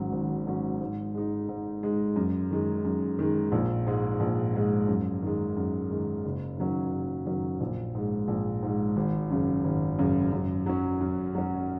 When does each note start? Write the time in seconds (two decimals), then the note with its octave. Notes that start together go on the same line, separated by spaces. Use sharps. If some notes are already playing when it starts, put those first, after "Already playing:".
Already playing: G#1 G#2 F#3 C#4
0.12 G#1
0.47 G#2 F#3 C#4
0.81 G#2
1.14 G#3 D#4
1.49 G#2
1.83 G#3 D#4
2.16 F#2
2.51 D#3 G#3
2.85 F#2
3.19 D#3 G#3
3.52 A#1
3.87 G#2 G#3
4.20 A#1
4.55 G#2 G#3
4.88 F#2
5.22 D#3 G#3
5.57 F#2
5.91 D#3 G#3
6.25 F#1
6.58 F#2 D#3 F#3 C#4
6.93 F#1
7.26 F#2 D#3 F#3 C#4
7.60 A#1
7.95 G#2 G#3
8.28 A#1
8.63 G#2 G#3
8.96 G#1
9.30 F#2 C#3
9.64 G#1
9.99 F#2 C#3
10.32 F#2
10.66 F#3 C#4
11.01 F#2
11.35 F#3 C#4